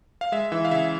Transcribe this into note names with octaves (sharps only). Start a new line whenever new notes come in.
F5
G#3 E5
E3 E5
F5
C#3 E5